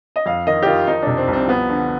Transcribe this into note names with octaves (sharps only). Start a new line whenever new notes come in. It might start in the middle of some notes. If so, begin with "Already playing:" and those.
D#5
F2 F5
D#3 D#5
G4
D#3 F4
F3 D#4
C3 D4
C4
C2
C4
F3 B3
D3